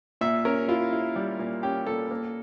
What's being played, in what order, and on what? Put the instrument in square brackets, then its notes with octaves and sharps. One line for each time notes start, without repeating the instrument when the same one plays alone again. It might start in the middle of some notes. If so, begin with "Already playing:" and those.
[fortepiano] A#2 E5
C#4 A#4
E4 F4
E4
G3
A#2
C#4 G4
A#2 A4
A#3